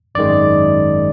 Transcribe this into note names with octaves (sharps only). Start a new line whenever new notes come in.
G#1 F#2 D#3 G#3 D5